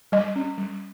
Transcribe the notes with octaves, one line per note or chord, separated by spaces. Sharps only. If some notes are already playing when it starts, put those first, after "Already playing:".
G3 D#5
C#4
G3